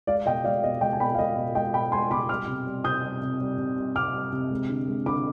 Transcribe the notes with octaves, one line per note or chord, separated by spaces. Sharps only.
G#3 D5 F5
B2 D#5 G5
G#3 D5 F5
B2 D#5
G#3 D#5 G5
G#5
B2 G5 B5
F5
G#3 D#5
B2 D#5
G#3 D#5 G5
B2 G5 B5
G#3 G#5 C6
B2 B5 D6
G3 D6 F6
C3
G3
C3 D#6 G6
G3
C3
G3
C3
G3
C3 D6 F6
G3
C3
G#3
D3
G#3
D3 B5 D6